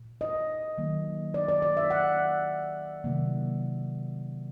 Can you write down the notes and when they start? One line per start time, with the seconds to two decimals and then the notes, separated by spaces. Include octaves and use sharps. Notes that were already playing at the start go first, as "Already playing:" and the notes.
Already playing: A#2
0.21 D#5
0.78 D#3 F#3 A#3
1.34 D5
1.48 D5
1.62 D5
1.77 E5
1.90 F#5
3.04 C3 D#3 F#3 A#3